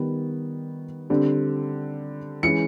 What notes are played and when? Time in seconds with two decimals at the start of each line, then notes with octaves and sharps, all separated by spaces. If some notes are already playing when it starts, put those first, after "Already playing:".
Already playing: D#3 G3 B3
1.10 D3 G3 C4
2.43 E3 G#3 C#4 C#7